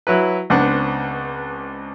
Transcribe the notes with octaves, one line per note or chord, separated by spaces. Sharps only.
F#3 E4 B4
C#2 B3 C4 D4 F#5 F#6